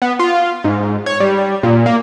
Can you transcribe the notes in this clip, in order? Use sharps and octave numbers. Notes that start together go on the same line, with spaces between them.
B3
F4
G#2
C#5
G3
A#2
A#3